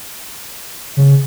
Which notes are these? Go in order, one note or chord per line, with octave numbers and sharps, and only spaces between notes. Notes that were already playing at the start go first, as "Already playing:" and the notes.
C#3